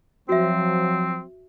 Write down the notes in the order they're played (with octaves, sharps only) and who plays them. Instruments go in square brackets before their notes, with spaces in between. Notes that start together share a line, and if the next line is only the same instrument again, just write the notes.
[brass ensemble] F3 F#3 [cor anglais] C4 [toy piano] F#4 E5